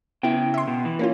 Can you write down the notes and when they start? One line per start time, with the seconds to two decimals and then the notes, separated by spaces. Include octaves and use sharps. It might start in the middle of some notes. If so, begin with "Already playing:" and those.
0.23 C#3 B3 E4 G5
0.54 E5 C6
0.68 B2
0.85 E3
0.99 A#3 C#4 F4